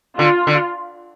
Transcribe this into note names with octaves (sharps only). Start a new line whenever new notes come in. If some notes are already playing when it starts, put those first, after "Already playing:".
D3 F4
D3